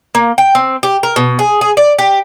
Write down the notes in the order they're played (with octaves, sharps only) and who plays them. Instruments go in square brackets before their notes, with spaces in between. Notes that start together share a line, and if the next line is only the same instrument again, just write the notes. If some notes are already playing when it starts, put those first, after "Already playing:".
[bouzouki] A#3
G5
C4
G4
A#4
B2
G#4
G#4
D5
G4